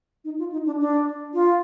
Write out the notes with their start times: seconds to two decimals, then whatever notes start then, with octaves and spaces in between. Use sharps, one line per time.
0.25 D#4
0.39 F4
0.52 D#4
0.66 D4
0.80 D4
1.34 F4